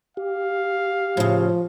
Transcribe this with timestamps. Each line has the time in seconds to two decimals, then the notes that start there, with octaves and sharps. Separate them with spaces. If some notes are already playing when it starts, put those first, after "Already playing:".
0.17 G4 F5
1.17 A2 C#3 F3